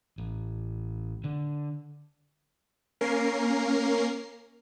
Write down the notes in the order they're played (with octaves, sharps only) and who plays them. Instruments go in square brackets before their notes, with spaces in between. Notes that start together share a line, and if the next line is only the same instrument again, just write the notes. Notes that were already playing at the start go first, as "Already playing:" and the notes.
[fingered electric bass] A1
D3
[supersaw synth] A#3 C#4 A#4 C7